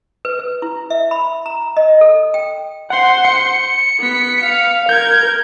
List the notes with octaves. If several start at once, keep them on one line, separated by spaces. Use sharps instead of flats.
B4
B4
E4
E5
B5
A#5
D#5
A4
G5
C5 F#5 C6
C#7
B3 B6
F5
A#4 G6 G#6